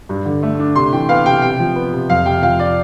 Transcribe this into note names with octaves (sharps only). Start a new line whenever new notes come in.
G2
D3
A3
D4
C3 C6
E3 G5
B3 F5
C3 G5
C3 G5
F3
B3
C3
F2 F5
C3 G5
F3 F5
D5